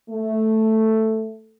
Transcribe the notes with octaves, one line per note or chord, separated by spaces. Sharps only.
A3